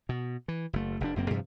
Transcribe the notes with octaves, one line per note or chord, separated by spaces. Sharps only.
B2
E3
F#1 A3
F1 C3 D4
F#1 F#2 A#3 C4
G2 C3 E3 F3